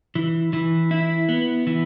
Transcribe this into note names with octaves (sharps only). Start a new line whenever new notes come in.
E3
E3
E4
B3
E3